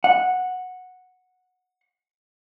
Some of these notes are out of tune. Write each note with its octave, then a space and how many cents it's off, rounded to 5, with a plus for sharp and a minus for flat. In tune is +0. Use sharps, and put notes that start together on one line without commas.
F#5 -10